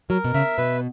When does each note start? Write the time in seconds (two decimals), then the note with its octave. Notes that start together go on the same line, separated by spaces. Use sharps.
0.10 F#3 A#4
0.24 B2
0.34 C#3 E5
0.57 B2 B4